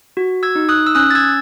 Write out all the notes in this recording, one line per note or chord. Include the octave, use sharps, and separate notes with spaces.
F#4
E6 G#6
D#4
D#6 F#6
E6
C#4 D#6 F#6
A6
E6 G#6